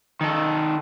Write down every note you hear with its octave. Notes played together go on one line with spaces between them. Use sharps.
D#3 A4